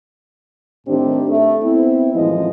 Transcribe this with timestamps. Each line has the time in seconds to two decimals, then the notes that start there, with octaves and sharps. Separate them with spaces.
0.87 A2 D#3 C4 D4 G4
1.28 A3
1.62 B3 C4 E4
2.14 F#2 A2 E3 F3 G#3 D#5